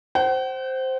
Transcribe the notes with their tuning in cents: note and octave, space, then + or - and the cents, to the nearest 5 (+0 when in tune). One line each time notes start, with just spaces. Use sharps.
C5 +0 F#5 +45